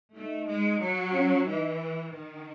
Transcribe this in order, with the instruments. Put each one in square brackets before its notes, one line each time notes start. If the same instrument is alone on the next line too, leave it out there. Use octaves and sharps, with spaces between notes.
[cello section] A3 [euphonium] D#4
[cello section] G#3
F#3
[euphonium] C#4
[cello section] E3 [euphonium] D#4
[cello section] D#3